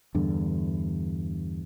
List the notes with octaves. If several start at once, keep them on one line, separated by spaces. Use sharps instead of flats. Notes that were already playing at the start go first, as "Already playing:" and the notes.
E2 G2 D3